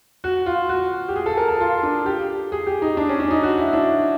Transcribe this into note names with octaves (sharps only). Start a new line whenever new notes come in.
F#4
F4
F#4
G4
G#4
A4
A#4
A4
F4
D4
G4
G#4
G4
D#4
D4
C#4
D4
D#4
F#4
E4
D4